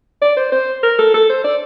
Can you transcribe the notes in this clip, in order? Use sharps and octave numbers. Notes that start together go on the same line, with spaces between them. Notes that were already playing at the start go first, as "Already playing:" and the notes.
D5
C5
C5
A#4
A4
A4
C5
D5